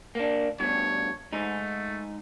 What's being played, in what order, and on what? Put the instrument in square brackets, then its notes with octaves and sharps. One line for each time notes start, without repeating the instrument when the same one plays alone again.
[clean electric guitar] A#3 D4
[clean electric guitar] G2 B2 [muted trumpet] C#5
[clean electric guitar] G#2 D#4 [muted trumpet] A3